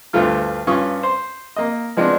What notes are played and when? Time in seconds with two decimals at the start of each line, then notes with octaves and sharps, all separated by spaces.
0.13 D2 G2 A3 F4 F6
0.67 G2 C#4 F4 C#6 D#6
1.03 C5
1.56 A#3 D#5
1.97 F3 G#3 B3 C4 D4